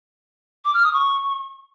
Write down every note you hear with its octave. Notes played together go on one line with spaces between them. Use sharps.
D6
F6
D#6
C#6